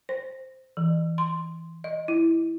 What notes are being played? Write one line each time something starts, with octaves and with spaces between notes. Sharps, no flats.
C5
E3
C6
D#5
E4